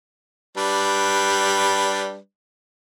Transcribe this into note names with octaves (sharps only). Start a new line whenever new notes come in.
G3 D4 B4